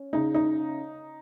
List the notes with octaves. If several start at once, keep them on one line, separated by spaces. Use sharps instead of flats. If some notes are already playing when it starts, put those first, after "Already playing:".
Already playing: C#4
C#3 D#4
D#4